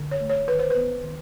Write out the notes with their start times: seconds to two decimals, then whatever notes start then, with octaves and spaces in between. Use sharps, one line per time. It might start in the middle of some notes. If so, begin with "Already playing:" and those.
Already playing: D3
0.11 C#5
0.21 A3
0.29 C#5
0.48 D#3 B4
0.59 C5
0.70 B3 B4
1.03 D#3